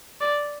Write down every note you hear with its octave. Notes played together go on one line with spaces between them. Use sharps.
D5